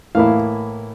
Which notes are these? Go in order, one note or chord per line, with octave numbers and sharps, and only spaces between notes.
A2 E3 A#3 E4 F5